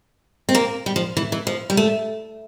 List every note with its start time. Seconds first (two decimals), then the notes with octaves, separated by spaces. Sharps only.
0.49 C4
0.55 A#3
0.86 G3
0.96 F3
1.17 E3
1.32 E3
1.47 F3
1.70 G3
1.77 A3